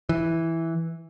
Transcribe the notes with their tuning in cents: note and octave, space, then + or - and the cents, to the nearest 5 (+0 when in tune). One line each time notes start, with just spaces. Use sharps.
E3 -5